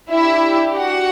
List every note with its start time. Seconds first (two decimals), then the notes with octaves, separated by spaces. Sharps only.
0.10 D4 E4 G4 E5
0.78 F#4 F#5